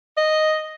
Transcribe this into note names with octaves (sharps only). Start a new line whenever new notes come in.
D#5